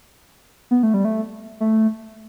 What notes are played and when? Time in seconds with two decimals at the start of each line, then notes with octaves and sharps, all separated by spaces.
0.71 B3
0.83 A3
0.94 G3
1.05 A3
1.60 A3